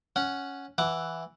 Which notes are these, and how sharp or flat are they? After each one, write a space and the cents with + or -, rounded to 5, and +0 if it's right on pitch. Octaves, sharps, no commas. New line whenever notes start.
C#4 +0 F#5 +0
E3 +0 F#5 +0 D6 +0